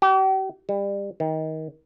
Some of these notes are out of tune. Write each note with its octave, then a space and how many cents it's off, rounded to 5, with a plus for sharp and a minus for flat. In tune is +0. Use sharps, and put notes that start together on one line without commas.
G4 -40
G3 +30
D#3 +25